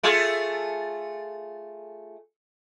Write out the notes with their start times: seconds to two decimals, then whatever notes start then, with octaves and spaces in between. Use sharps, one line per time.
0.03 A3 F4 G#4